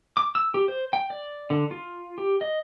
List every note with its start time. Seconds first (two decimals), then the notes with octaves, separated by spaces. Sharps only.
0.17 D6
0.35 E6
0.54 G4
0.68 C5
0.93 G5
1.10 D5
1.50 D3
1.71 F4
2.18 G4
2.41 D#5